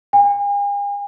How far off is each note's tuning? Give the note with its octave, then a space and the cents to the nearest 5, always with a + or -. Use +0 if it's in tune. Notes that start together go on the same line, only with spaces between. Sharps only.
G#5 -45